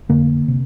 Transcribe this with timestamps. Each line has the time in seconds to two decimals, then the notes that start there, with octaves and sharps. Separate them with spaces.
0.09 F2 D3 A#3
0.48 C3